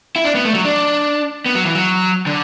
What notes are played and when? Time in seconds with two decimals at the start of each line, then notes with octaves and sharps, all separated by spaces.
0.16 E4
0.24 D4
0.35 B3
0.45 A3
0.55 F#3
0.65 D4
1.46 B3
1.55 F#3
1.65 E3
1.75 F#3
2.26 D3